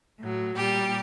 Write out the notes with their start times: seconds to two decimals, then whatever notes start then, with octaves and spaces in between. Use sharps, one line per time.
0.20 A2 F#3
0.55 A#2 G3 G4